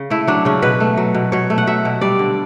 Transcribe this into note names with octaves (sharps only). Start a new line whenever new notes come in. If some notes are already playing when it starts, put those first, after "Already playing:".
Already playing: C#3
A3 E4
F#3 D4
C#3 C#4
B2 B4
A3
F#3
B2
B2 C#5
A3
F#5
F#3 E5
B2
G3 D5
D3